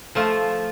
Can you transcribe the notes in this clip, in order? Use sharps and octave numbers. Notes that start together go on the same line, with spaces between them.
F3 A3 F4